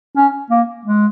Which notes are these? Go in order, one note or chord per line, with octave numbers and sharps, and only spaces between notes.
C#4
A#3
G#3